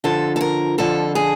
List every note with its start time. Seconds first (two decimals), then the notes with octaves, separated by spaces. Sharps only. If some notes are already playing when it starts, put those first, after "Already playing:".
0.04 F2 D3 F3 A4
0.36 A4
0.41 A#4
0.78 F2 D3 F3 A4
1.15 G#4